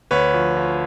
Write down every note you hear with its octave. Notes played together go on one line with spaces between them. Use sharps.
D2 B4 C#5
F3
F3